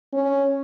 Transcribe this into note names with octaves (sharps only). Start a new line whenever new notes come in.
C#4